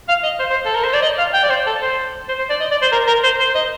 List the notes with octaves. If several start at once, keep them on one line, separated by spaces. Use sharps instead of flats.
F5
D#5
C5
C5
A4
A#4
C5
D5
D#5
F5
G5
D5
C5
A4
C5
C5
C5
D5
D#5
D5
C5
A#4
A#4
C5
C5
D#5